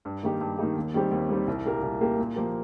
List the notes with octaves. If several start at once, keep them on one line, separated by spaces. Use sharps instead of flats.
G2
D#3 A#3 D#4 G4
G2
D#3 A#3 D#4 G4
D#2
D#3 G3 C4 G4
D#2
D#3 G3 C4 G4
C2
A#2 A#3 G4 A#4
C2
A#2 A#3 G4 A#4
A#2
F3 A#3 G4 A#4